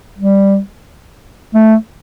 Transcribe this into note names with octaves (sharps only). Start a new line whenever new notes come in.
G3
A3